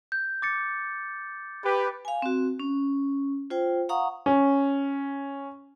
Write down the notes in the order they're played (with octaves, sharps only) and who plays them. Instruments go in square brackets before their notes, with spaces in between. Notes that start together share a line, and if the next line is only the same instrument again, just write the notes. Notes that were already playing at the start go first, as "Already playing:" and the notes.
[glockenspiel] G6
D6 A6 C#7
[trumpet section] G4 B4
[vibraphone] F5 G#5
C4 F#4
C#4
F4 C5 G5
F5 F#5 A#5 C#6 D#6
[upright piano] C#4